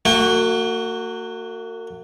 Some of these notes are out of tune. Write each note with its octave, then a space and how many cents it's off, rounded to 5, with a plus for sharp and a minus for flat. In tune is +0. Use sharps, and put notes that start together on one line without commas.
A#3 -40 F#4 +0 G5 +40